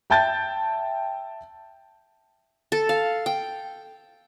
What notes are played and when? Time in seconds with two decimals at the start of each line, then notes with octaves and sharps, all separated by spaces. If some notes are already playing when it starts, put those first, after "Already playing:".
0.10 E5 G5 A5 G6 A6
2.72 A4
2.89 F5
3.26 G5